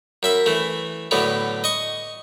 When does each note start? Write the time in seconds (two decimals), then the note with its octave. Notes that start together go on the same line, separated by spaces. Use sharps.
0.23 F#2 E5 B5
0.46 E3 A3
1.11 A2 D3 F#3 B3
1.64 D#5 C#6